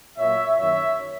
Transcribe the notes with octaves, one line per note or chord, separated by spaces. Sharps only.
A#2 F#3 A#3 C#5 E5
F#2 D#3 A#3 C#5 E5